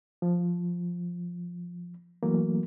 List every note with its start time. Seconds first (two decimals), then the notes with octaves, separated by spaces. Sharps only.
0.22 F3
2.23 E3 F#3 A3 A#3